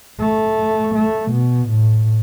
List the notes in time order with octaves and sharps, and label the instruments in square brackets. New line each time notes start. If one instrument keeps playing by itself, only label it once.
[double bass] A3
A3
B2
A2